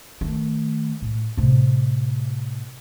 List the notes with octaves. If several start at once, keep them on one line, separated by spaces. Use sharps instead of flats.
D#3 A3
A2
A2 C3